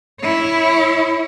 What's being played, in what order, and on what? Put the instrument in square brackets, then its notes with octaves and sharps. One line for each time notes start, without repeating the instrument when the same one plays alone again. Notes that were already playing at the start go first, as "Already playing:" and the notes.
[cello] E4 C#5